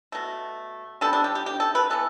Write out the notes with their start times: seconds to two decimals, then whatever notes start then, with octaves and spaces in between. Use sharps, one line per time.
0.12 B2 A3
1.01 D3 G3 B3 A4
1.13 D4
1.24 G4
1.35 G4
1.46 G4
1.60 A4
1.75 B4
1.90 E3 B3 A4